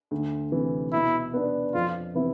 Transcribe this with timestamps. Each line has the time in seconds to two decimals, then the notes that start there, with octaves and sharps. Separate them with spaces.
0.11 D2
0.52 C3 E3
0.93 B2 E4
1.34 B3 D4
1.74 F2 F4
2.15 C3 E3 B3 E4